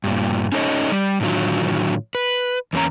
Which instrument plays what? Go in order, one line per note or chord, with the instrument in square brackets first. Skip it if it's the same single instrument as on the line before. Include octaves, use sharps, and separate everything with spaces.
[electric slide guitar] G2 A#2
C#4 D#4 A4 A#4 C#5 D#5
G3
A2 D3 D#3 F#3 F4
B4
E2 A#3 C#4 A#5